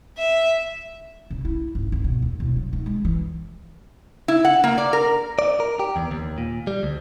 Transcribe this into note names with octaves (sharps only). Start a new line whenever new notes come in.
E5
C#3
E4
G#1
G#1
B2
D#2
E1
F#3
D#3
G#3
E3
E4
F#5
A#3
D5
A#4
D5
A#4
G4
E2
D#2
A#2
G3
D2